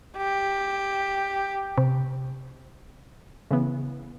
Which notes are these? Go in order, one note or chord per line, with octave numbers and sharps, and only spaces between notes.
G4
C3
C#3 E3 B3